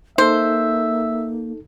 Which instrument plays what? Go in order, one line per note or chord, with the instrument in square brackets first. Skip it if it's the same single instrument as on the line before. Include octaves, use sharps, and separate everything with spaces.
[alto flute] A#3 [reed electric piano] D#4 A4 [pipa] C5 [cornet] E5